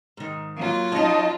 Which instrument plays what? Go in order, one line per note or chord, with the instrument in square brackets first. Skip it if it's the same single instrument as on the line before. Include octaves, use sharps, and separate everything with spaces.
[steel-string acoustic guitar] G#2 D#3
[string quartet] F#3 F4 [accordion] A#3
[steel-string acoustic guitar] C#4 D#4 [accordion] D#5 A5